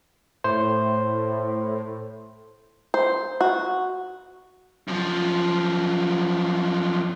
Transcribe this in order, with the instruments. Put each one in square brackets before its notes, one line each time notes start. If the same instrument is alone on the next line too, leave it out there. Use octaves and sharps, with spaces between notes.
[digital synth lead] A2 [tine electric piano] C5
[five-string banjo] C5
F#4
[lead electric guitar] F#2 F3